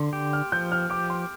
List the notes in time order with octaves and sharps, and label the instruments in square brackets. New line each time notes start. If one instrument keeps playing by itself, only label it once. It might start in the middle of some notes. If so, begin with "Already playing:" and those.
Already playing: [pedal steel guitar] D3 [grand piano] C6
[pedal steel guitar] G4
[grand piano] F6
[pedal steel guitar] F3 [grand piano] G6
[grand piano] F6
[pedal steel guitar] G4 [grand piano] D6
[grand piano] C6